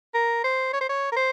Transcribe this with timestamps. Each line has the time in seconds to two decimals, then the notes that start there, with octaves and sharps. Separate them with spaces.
0.15 A#4
0.44 C5
0.73 C#5
0.81 C5
0.89 C#5
1.12 A#4
1.17 C5